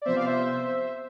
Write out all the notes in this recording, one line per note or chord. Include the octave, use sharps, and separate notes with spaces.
D5
C3 F3 B3 C5 E5
D5 F5
C5 E5